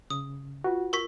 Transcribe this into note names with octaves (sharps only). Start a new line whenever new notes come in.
C#3 D#6
F4 F#4 B4 G5
A#4 C#6 B6